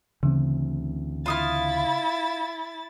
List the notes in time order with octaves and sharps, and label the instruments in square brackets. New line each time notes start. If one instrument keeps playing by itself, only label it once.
[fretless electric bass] D2 E3 C4 [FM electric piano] C#3
[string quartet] E4 A6 [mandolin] F4 D#6 F6